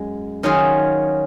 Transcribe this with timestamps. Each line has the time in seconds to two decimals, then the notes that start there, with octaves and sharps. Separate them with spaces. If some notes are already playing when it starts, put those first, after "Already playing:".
Already playing: F#2 G#3
0.43 D#3 F#3 C#4 F4 G#4